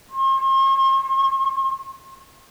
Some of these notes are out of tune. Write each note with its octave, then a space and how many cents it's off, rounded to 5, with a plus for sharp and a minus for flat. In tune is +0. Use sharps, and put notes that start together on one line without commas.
C6 +45